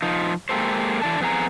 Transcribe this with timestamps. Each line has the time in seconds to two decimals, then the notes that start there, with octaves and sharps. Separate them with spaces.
0.02 F3 D#4
0.49 G#3 A#3 G4 A4 C5
1.02 D3 E3 D5 A5
1.21 F2 B3 G#4 A#5